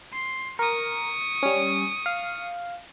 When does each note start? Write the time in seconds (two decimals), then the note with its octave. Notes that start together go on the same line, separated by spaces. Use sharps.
0.12 C6
0.59 A#4 C#6 D#6
1.43 G3 C#4
2.06 F5